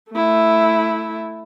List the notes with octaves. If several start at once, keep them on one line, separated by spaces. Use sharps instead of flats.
A3 E4